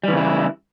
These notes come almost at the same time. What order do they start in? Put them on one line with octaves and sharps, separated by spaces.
G3 E3 C#3 E4